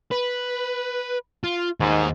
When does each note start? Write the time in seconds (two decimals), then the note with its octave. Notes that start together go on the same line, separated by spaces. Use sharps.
0.12 B4
1.44 F4
1.80 D#2 G#2 D#4